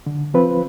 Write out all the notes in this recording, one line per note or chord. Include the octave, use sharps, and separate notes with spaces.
D3
F3 C4 F4 B4